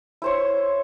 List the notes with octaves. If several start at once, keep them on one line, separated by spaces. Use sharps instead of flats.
E4 C5 C#5